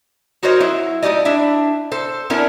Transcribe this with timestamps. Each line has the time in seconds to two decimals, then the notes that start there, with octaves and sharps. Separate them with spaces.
0.43 D#4 F#4 A#4 C5 C#5 D#5
0.60 F#3 E4
1.02 A3 D#4 G4 D5 D#5
1.25 D4 E4 E5
1.92 A4 C5
2.30 B3 C#4 D4 E4 A4 A#4